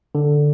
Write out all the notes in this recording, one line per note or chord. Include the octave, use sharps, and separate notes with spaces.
D3